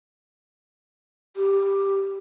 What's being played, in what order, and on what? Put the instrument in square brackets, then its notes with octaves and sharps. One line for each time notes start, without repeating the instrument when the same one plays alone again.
[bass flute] G4